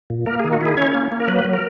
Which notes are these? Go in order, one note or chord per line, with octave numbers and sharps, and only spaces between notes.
A#2
A#3 A#4
G#4
D#3
F#4
E4 G#4
C#4 C#5
A#3
A#3
A#4
F#3 B4
F#3
A#4